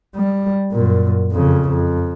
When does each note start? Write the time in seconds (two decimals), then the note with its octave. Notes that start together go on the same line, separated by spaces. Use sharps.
0.16 G3
0.72 F#2 A#2
1.32 F2 C#3
1.69 F2